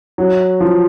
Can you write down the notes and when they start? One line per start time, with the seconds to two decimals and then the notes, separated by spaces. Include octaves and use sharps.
0.18 F#3
0.60 F3